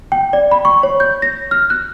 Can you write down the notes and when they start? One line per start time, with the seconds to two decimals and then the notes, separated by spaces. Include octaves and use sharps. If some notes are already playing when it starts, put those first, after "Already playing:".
0.12 G5
0.33 D5
0.51 B5
0.65 C#6
0.83 C#5
1.00 G6
1.22 A#6
1.51 F6
1.70 F#6